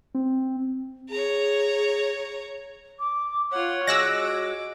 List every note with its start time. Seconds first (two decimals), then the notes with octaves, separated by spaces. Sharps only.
0.15 C4
1.10 G#4 C#5 A#5
2.99 D6
3.51 F4 C#5 F#5
3.87 G#3 F#4 D6 E6 F#6 A#6